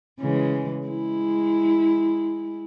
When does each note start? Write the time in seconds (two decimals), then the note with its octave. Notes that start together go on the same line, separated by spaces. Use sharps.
0.20 C#3 E3 G#3
0.87 G#3 E4